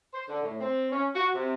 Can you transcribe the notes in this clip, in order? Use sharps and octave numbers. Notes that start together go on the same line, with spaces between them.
C5
D3
A2
C4
C#4
F#4
C3